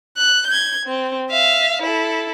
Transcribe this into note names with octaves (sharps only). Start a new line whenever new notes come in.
F#6
G6 G#6
C4
E5 F5
E4 A4